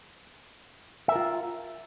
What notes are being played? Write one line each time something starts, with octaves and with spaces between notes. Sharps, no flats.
F4 A#4 E5